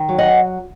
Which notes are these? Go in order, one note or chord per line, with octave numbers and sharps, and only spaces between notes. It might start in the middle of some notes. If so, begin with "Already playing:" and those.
Already playing: D#3
F#3
D#5 F#5